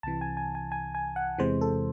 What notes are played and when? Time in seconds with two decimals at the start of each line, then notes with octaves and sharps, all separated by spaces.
0.03 C2 C3 E3 A5
0.21 G#5
0.37 G#5
0.55 G#5
0.72 G#5
0.95 G#5
1.16 F#5
1.38 E2 C3 E3 G#3 C5
1.61 A4